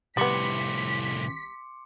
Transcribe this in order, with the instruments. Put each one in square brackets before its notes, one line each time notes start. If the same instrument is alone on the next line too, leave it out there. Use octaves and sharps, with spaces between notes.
[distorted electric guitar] C2 A2 [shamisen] G3 B3 [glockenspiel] C6 D6 C#7 [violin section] B6